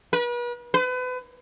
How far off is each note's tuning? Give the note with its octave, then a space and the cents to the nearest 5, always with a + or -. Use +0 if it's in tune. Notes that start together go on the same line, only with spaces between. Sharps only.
B4 -40
B4 +35